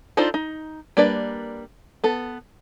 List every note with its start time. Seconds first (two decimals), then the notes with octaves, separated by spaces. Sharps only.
0.17 D4 D#4 F4 A4 C5
0.34 D#4
0.97 G3 A#3 D4 B4 D5
2.04 B3 A4